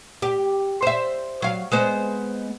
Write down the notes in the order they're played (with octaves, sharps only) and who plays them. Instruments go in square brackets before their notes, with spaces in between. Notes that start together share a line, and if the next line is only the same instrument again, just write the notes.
[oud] G4
C5 E5
F#3 F5
G#3 B3 C5